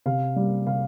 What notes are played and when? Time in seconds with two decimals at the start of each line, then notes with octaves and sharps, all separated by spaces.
0.06 C3 F5
0.36 G3 A#3
0.67 C3 F5